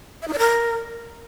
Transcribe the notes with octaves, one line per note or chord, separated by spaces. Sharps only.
E5
D#4
D5
A#4